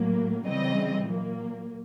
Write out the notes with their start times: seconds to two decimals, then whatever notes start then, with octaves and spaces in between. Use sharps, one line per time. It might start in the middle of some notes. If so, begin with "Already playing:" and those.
Already playing: A2 F#3 A#3
0.45 C#3 E3 G3 C4 D#5
1.08 A#2 F#3 A#3